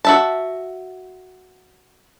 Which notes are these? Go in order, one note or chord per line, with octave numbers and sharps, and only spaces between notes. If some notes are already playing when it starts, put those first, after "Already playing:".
F#4 E5 A5